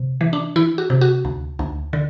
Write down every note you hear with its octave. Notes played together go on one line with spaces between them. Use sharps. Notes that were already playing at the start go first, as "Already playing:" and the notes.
Already playing: C3
E3
D4
E3 E4
F#4
C3
F#4
D2
D2
D3